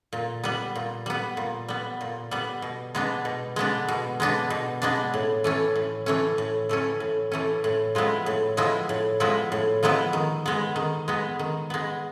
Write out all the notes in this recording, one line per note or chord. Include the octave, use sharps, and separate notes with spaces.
A#2
G3 B3
A#2
G3 B3
A#2
G3 B3
A#2
G3 B3
B2
G#3 B3 D4
B2
G#3 B3 D4
B2
G#3 B3 D4
B2
G#3 B3 D4
A2
E3 A3 C#4
A2
E3 A3 C#4
A2
E3 A3 C#4
A2
E3 A3 C#4
A2
F3 G#3 B3 E4
A2
F3 G#3 B3 E4
A2
F3 G#3 B3 E4
A2
F3 G#3 B3 E4
D#3
G#3 B3
D#3
G#3 B3
D#3
G#3 B3